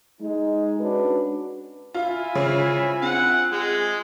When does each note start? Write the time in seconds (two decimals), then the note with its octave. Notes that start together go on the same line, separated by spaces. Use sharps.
0.21 G#3 D#4
0.79 C#4 D4 F#4 B4
1.94 E4 F4 E5 G#5
2.35 C#3 F4 C5
3.02 C4 F#5
3.53 G#3